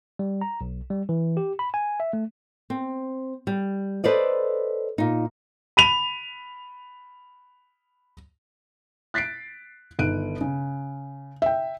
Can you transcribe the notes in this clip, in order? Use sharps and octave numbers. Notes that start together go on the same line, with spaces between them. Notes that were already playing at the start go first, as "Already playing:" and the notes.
G3
A#5
B1
G3
E3
G4
B5
G#5
E5
A3
C4
G3
A4 B4 C5 D5 D#5
A#2 D#4
B5 D#7 F7
F#6 A6 B6 C7 D7
G1 D#3 F#6 D7 D#7
C#3
E5 G5